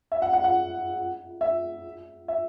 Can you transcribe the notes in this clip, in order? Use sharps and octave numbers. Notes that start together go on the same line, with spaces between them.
E5
F#5
F#5
F#5
E5
E5